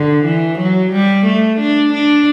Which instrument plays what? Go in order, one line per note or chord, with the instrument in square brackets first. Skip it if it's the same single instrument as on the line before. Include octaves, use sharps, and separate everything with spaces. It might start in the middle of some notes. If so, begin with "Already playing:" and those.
Already playing: [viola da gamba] D3
E3
F#3
G3
A3
D4
D4